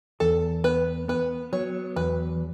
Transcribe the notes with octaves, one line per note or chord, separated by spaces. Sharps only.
E2 A4
B3 B4
B3 B4
F#3 C#5
E2 B4